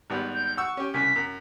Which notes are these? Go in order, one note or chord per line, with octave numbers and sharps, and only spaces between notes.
G#1 G3 B3
G6
F#5 C#6 E6
C#4 G4
C2 C#3 G#5 B6
F#2